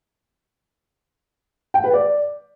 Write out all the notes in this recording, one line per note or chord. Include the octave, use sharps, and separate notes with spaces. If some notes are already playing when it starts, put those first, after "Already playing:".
G5
B4
D5